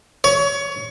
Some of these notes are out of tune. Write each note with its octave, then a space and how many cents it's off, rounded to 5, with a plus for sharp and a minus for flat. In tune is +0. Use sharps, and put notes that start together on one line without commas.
C#5 +25